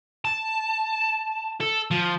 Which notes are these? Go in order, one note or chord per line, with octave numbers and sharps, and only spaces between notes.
A5
A4
F3